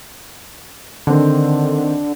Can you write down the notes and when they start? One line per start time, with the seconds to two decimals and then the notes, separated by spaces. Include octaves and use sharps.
1.07 D3 D#3 C4 D4